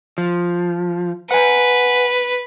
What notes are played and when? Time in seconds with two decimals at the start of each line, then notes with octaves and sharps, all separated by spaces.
0.18 F3
1.31 B4 F#5 G#5